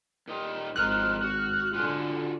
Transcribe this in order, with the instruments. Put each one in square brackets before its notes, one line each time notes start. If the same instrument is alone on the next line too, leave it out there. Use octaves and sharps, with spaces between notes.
[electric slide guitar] A#2 D#4 G4
[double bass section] G#1 [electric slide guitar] D#3 F3 A#4 [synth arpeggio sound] F6 F#6
[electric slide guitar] F#4
[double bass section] D3 [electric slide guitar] F4 F#4 G#5